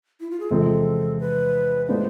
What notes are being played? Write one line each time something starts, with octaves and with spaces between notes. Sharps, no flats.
E4
F4
G#4
E2 C3 F3 G#3 C4 A4
B4
A2 G#3 B3 D4 F4 C5